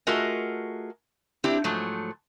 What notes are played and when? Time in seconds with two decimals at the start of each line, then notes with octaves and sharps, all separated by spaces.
0.07 A3 F4 F#4 G#4 A#4 D#5
1.44 C4 D4 E4 G4
1.64 G#2 F3 F#3 A3